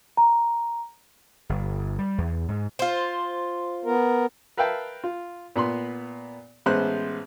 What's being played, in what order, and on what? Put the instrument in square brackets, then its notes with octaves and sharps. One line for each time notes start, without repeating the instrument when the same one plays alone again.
[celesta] A#5
[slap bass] G1
G3
E2
G#2
[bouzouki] F4 C5
[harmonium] B3 A#4
[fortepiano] A#4 B4 E5 F5 G5 A5
F4
A#2 B3 B5 C6
A1 G#3 B3 C5 F#6